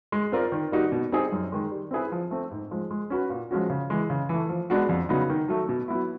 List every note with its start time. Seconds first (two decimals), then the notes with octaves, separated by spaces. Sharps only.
0.12 G#3
0.32 C4 F4 A#4 D5
0.52 D#3
0.72 G3 A#3 D#4 F#4
0.92 B2
1.12 G3 C4 D#4 G#4
1.32 F#2
1.52 D#3 G#3
1.71 G3
1.91 C4 E4 G#4 B4
2.12 F3
2.31 A3 C4
2.51 G#2
2.71 F3 G#3
2.91 G#3
3.10 C#4 F#4 B4
3.30 A#2
3.51 F3 G#3 C#4 F#4
3.70 C#3
3.90 E3 G#3
4.10 C#3
4.29 E3 A3
4.49 F3
4.70 G#3 B3 D4 F#4
4.89 F2
5.09 C#3 F#3 B3 D#4
5.30 D#3
5.48 F#3 A3
5.69 B2
5.88 F#3 B3 E4